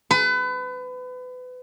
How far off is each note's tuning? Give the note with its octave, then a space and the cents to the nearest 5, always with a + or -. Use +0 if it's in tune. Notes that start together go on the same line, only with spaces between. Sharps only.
B4 +30